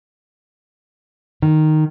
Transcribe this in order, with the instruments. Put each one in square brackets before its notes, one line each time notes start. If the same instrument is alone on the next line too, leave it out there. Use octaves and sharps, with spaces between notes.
[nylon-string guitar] D#3